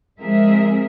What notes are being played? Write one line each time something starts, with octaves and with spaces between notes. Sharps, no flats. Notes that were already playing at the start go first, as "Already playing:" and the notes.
F3 G#3 C4 G#4 A#4 E5